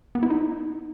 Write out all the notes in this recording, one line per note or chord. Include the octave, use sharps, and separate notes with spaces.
B3
E4
D#4